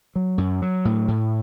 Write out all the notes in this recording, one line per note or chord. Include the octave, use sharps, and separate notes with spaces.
F#3
F#2
F#3
A2
A2